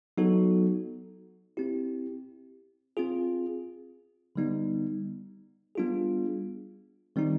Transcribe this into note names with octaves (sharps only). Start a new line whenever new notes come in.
F#3 B3 D#4 F#4 A4
C4 E4 G4
C4 F4 G#4
D3 G3 B3 D#4
G3 B3 D4 F4 G#4
D#3 G3 C4 D#4